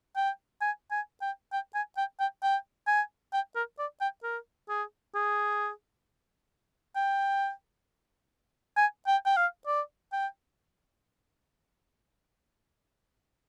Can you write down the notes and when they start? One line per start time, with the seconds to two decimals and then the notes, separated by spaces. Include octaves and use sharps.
0.16 G5
0.61 G#5
0.91 G#5
1.21 G5
1.52 G5
1.75 G#5
1.97 G5
2.20 G5
2.42 G5
2.87 G#5
3.33 G5
3.56 A#4
3.79 D5
4.01 G5
4.23 A#4
4.69 G#4
5.15 G#4
6.96 G5
8.76 G#5
9.07 G5
9.25 G5
9.37 F5
9.67 D5
10.12 G5